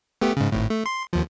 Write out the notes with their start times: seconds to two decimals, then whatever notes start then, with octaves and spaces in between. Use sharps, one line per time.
0.21 A3 B3 G4
0.37 G#2 C#3
0.52 G#1 A2
0.70 A3
0.86 C6
1.13 D#2 F3